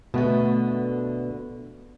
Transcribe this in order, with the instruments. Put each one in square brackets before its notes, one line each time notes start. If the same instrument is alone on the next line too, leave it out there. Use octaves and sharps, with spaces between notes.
[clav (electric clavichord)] B2 B3 [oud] D3 A3